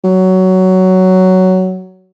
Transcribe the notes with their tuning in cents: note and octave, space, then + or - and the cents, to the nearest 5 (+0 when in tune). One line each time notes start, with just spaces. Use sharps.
F#3 +10